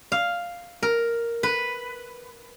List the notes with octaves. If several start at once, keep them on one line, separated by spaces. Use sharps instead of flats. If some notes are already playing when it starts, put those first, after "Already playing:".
F5
A#4
B4